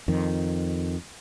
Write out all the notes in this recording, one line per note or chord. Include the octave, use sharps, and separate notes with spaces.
F2 D#3